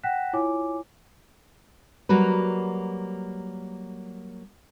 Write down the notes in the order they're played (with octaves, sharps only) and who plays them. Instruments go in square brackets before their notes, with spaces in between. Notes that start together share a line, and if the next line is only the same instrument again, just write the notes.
[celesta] F#5 G5 F#6 A#6 B6 E7
E4 F4 C#5 G#5 D6
[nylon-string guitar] F#3 G3 A#3 F#4 B4